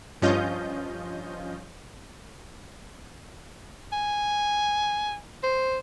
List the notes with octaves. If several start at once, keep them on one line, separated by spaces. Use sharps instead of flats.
G2 F3 C#4 F4 D#5 G6
G#5
C5